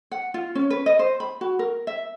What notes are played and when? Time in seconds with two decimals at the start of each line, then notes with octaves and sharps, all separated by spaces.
0.11 F#5
0.34 F4
0.55 C#4
0.70 B4
0.86 D#5
0.99 C5
1.20 B5
1.41 F#4
1.59 A#4
1.87 E5